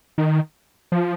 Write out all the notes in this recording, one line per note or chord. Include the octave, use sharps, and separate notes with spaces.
D#3
F3